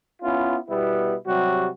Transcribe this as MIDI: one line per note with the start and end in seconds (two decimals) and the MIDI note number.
0.23 0.57 59
0.23 0.57 61
0.23 0.57 64
0.23 0.57 65
0.69 1.15 47
0.69 1.15 55
0.69 1.15 59
0.69 1.15 64
1.27 1.68 48
1.27 1.68 54
1.27 1.68 55
1.27 1.68 66